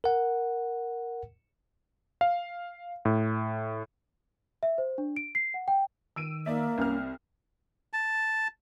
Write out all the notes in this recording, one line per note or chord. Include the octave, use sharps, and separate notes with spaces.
A#4 F#5
F5
A2
E5
C5
D4
D7
C7
F#5
G5
D#3 E6 D7 D#7
A#3 D#4 D5 E5
C2 C#4 F6
C4
A5